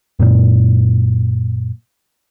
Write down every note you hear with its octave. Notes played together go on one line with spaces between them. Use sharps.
F#2 A#2